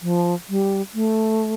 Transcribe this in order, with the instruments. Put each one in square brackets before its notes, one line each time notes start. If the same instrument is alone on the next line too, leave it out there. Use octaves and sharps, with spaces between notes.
[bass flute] F3
G3
A3